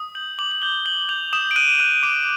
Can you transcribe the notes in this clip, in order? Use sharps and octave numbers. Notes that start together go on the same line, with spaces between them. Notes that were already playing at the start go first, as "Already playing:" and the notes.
Already playing: D#6
G6 F#7
D6 F#7
F#7
G6 G7
G6 F#7
G6 F7
D#6 E7
D7
F#6 D#7
F#6 D#7
D6 D7